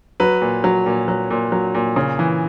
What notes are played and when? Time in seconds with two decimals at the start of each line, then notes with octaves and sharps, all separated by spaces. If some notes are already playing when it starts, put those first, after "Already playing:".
0.20 F#3 B4
0.42 A#2
0.64 F#3
0.86 A#2
1.08 F#3
1.31 A#2
1.52 F#3
1.75 A#2
1.96 C#3
2.19 E3